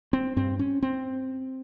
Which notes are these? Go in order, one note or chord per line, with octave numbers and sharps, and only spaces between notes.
C4
G2 C4
C#4
C4